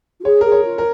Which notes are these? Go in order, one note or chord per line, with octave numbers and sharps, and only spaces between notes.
F4
G#4 C#5
G#4 A#4
C#5
F4
A#4